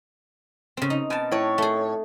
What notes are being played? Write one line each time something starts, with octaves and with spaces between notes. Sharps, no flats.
C#3 C4
D#4
B2 G#5 A5
A2 C#5
A3 G#4